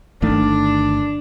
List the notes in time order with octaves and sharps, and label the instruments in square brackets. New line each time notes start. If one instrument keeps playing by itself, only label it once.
[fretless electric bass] G1 D#3 A3 [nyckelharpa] D4